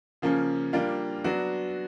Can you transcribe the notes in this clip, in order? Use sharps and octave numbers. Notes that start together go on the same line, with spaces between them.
C#3 F3 A#3 C#4
G3 A#3 D4 F4
F#3 B3 D4 F#4